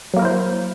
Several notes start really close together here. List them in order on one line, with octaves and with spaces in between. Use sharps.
F#3 A#3 A#4 E4 C5